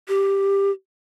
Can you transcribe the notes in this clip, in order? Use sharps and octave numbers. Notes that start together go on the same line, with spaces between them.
G4